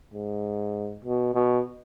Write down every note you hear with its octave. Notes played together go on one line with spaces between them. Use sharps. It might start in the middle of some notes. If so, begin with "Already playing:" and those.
G#2
B2
B2